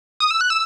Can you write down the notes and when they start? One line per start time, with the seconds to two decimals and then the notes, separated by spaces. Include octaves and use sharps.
0.20 D#6
0.31 E6
0.41 F#6
0.50 E6